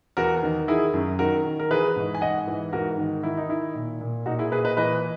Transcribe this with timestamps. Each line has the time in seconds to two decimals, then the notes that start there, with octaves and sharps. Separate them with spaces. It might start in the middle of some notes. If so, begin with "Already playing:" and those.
0.17 E2 F#4 A#4
0.43 D#3
0.68 D#3 E4 G#4
0.94 F#2
1.19 D#3 F#4 A#4
1.45 D#3
1.59 A#4
1.71 E3 G#4 B4
1.96 G#2
2.15 G#5
2.21 G#2 D#5 F#5
2.47 E3
2.73 G#2 F#4 A#4
2.98 D#3
3.23 D#3 E4
3.37 D#4
3.49 D#3 E4
3.75 A#2
4.01 A#2
4.26 A#2 D#4 F#4
4.39 E4 G#4
4.52 A#2 G#4 B4
4.65 B4 D#5
4.77 E3 B4 D#5